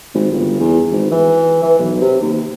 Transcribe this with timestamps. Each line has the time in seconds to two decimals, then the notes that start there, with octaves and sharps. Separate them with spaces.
0.14 G#1
0.32 G1
0.60 E2
0.92 G#1
1.11 E3
1.63 E3
1.79 B1
2.01 C3
2.22 D#2